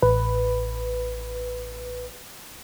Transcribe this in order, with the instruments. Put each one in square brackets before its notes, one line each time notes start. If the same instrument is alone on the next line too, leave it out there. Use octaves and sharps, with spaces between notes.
[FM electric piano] A1 B4